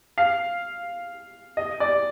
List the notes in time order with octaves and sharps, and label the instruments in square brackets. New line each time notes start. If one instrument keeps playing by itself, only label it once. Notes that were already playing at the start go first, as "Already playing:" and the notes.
[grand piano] F5
D#5
D5